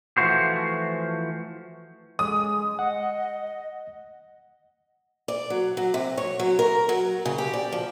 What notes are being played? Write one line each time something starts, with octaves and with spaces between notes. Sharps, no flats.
E3 F3 A3 F#4 C5
G#3 D#6
D#5 F#5
D5
F#3
F#3
C3
C#5
F#3
A#4
F#3
C#3
G4
D5
F3